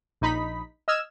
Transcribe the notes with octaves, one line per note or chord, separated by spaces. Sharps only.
A#1 D#4 B5 B6
D#5 E6 F6 G#6 E7